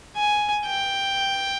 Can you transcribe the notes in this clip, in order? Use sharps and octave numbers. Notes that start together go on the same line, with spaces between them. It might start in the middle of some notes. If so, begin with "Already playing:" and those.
G#5
G5